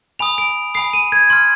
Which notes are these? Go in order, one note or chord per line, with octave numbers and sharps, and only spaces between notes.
G#5 B5 D#6 F7
D7
G#5 B5 D#6 C7
D#7
G#6
C6 F6 G#6